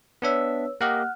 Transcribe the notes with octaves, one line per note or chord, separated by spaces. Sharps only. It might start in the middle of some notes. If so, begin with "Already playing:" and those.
B3 D4 B4 C#5 E5 E6
A#3 G4 D#5 F#5 F6 F#6